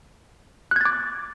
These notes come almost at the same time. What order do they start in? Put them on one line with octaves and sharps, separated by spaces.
F#6 G#6 A6 D6